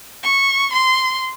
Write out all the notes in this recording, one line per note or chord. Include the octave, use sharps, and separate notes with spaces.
C#6
C6